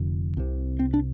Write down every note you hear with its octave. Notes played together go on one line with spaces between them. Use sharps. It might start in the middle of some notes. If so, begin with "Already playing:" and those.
Already playing: F1 F2 D3
C2 C3
C4
D4